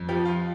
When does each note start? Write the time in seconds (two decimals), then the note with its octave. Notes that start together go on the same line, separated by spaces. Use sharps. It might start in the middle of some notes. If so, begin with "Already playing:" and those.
Already playing: F2
0.09 F3 G4
0.25 F4